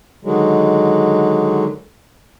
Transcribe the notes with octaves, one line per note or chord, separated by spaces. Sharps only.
D3 D#3 F#3 G#3